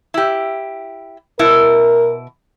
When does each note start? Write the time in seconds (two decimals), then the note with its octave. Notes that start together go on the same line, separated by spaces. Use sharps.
0.14 E4 G4
1.39 B2 E4 A#4